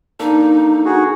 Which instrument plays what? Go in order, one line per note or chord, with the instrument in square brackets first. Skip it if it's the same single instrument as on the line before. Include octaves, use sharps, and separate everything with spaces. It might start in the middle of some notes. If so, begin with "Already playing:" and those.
[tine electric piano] A#3 D4 A4 [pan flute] D#4
[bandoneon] F#4 G#4